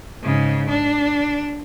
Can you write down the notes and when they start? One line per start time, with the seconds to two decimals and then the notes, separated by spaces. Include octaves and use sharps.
0.23 G#2 C#3
0.69 D4